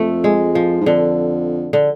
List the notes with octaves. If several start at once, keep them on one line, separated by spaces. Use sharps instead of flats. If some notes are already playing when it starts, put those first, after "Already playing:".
Already playing: F2 A3
G#3
F3
G#2
F2 D3
D3